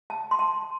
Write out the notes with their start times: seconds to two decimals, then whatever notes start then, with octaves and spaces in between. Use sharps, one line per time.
0.10 A5
0.31 C6
0.39 A5